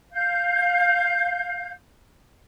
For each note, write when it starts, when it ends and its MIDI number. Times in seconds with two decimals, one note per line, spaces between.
0.12 1.70 77
0.12 1.70 91